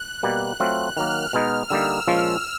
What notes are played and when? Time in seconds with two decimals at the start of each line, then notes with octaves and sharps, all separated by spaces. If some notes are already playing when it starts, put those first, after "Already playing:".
Already playing: F#6
0.23 B2 G3 A#3
0.60 F#3 A3 C4 F4 F#6
0.97 D#3 F#3 A#3 F6
1.33 B2 G#3 B3 D#4
1.70 D3 G3 A#3 D#4 E6
2.08 A#2 F3 G#3 C#4 F4